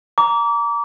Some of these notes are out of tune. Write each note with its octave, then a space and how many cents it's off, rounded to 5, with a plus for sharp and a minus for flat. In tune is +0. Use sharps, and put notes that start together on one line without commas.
A#5 +0 D6 -30